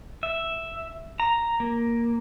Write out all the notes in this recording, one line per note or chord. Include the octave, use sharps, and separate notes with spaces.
E5
A#5
A#3